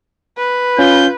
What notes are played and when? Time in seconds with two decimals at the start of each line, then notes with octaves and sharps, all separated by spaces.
0.37 B4
0.79 C#4 F4 G6